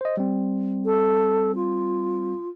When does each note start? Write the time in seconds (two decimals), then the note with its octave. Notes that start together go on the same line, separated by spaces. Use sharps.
0.01 C5 D#5
0.17 G3 C4
0.85 A4
1.55 F4